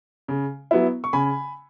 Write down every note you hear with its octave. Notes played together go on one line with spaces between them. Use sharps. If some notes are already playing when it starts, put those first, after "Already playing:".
C#3
F#3 B3 E4
C#6
C#3 G#5 B5